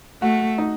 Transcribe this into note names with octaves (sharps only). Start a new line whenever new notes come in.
A3 F#4
D#4